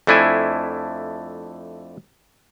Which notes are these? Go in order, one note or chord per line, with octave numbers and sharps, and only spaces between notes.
F2 A3 D4 E4 G#5